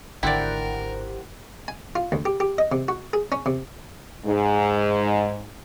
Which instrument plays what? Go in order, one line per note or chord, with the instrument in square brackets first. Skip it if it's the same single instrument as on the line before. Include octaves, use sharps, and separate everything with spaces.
[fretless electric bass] G#1 D3 [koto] E4 D5 [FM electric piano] G4 C5 F#5 [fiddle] A#4
[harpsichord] G#5
F4
D2
G4
G4
D#5
C3
F#4
G#4
C#4
C3
[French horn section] G#2